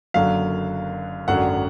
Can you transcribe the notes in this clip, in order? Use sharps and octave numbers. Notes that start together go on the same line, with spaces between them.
F#1 F#2 D3 F#3 F5
G#1 F#2 D3 F#3 F#5